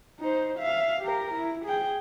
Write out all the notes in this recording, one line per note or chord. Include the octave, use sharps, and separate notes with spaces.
D#4 C5
E5 F5
G4 A#4
E4
G#4 G5